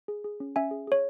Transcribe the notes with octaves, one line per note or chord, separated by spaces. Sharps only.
G#4
G#4
C#4
C#4 E5 G#5
G#4
G#4 C#5